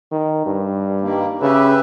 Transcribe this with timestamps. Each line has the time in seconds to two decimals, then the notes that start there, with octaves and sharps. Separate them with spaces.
0.11 D#3
0.45 G2
1.01 D#3 G3 A#3
1.41 C#3 G4 B4 E5